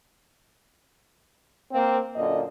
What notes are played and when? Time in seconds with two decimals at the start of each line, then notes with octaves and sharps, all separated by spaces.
1.73 A#3 C4
2.16 F#2 A#2 D3 D#5